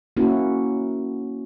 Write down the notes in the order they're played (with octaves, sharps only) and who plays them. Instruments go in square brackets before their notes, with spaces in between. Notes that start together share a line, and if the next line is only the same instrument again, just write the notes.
[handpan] A#3 C#4 E4 F#4